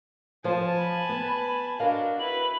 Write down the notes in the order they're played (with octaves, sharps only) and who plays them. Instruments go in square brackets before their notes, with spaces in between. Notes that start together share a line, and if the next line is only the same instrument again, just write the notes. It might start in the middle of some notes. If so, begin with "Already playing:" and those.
[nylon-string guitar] F3 C5 [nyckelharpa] G#5 A5
[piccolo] B5
[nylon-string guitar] B3
[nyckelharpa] D4 F#4 [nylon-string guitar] A#4 D#5 F5
[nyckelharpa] E4 B4 [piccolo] F#7